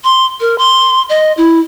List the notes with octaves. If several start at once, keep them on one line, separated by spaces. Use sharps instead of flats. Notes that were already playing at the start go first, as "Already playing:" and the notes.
C6
A#4
C6
D#5
E4